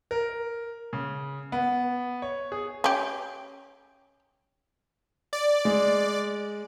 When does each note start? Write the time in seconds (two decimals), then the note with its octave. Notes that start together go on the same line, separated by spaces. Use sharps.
0.11 A#4
0.93 C#3
1.52 B3
2.22 C#5
2.52 G#4
2.84 C#4 G4
5.33 D5
5.65 G#3